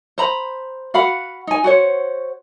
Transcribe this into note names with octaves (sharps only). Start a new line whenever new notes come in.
C5 A#5 B5
F#4 F5 F#5 B5
D#4 G#5
F#4 C5 C#5